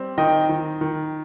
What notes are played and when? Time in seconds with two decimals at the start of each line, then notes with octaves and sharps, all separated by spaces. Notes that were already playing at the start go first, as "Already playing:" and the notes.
Already playing: G3 C4
0.18 D#3 D#5 G5
0.49 D#3
0.81 D#3